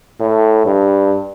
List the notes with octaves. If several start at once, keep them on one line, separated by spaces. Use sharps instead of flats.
A2
G2